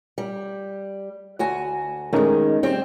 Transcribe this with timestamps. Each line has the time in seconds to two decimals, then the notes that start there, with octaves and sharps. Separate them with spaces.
0.18 G3
1.39 D2 F#4 G#5
2.13 D#3 G#3 A3 C#4 D#4
2.63 G3 C4